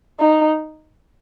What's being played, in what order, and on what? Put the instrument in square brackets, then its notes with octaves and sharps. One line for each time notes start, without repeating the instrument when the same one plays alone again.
[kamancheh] D#4